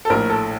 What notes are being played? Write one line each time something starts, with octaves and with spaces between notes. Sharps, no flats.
A4
A#1 A2 A#4
A4